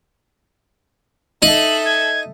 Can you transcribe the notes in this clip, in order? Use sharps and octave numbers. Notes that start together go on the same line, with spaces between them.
D#4 A4 E5 F#7
G#6